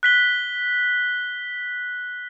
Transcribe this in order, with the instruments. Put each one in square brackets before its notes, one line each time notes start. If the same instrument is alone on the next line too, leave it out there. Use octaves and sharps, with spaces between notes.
[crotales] F#6 B6 G7